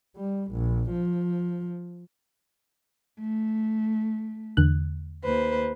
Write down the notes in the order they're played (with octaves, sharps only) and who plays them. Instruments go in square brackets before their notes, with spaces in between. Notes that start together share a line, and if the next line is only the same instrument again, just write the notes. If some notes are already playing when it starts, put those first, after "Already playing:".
[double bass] G3
A#1
F3
[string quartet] A3
[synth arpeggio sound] E2 D3 F#6
[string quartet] D#2 B4 C5